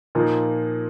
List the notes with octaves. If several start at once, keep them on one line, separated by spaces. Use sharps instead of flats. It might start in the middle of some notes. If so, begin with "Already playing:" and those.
A#2 F3 A#3 D#4